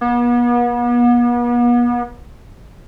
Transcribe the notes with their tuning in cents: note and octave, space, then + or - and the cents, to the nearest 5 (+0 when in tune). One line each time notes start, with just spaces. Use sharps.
B3 -40